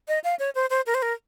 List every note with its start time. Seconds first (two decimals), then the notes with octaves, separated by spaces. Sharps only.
0.08 D#5
0.24 F5
0.39 C#5
0.55 C5
0.70 C5
0.86 A#4
0.94 C5
1.02 A#4